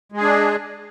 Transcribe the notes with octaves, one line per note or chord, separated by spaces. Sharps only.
G#3 D4 G#4